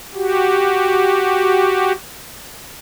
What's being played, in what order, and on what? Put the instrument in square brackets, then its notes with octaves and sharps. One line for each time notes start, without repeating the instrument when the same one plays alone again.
[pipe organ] F#4 G4